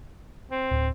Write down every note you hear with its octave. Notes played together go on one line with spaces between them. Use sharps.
C4
D1